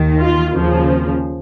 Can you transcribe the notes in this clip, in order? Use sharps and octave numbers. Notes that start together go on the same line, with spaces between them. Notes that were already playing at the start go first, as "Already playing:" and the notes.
Already playing: D#2 D#3
F4
D#2 C#3 F3